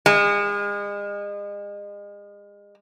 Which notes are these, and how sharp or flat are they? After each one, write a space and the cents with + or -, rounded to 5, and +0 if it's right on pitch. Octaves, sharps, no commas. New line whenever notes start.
G#3 -35